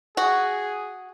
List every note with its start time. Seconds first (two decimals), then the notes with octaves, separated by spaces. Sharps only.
0.17 F#4 G#4